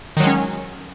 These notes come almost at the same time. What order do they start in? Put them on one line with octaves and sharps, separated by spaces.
D#3 F#3 G#3 C#4